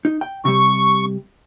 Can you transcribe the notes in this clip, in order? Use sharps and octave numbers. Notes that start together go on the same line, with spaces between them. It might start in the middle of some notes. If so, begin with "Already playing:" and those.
D#4
G5
C3 G3 C#6